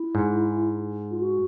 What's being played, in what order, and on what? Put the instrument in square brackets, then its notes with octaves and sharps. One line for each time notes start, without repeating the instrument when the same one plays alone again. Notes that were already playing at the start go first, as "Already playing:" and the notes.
Already playing: [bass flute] E4
[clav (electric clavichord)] G#2
[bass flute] F4
F#4